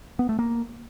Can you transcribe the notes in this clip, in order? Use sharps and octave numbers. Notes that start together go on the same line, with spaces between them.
B3
A3
A#3